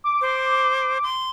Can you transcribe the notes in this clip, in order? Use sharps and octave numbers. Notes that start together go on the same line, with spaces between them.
D6
C5
C6